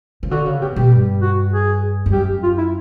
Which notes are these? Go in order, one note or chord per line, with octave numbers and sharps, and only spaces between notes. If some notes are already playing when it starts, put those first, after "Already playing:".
C#3
D3 F#4
C#3
B2 G4
B2 G4
G2
F#4
G#4
G2
F#2 G4
F4
E4